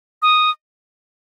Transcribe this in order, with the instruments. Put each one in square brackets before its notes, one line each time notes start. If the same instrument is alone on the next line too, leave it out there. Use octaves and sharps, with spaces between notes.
[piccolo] D#6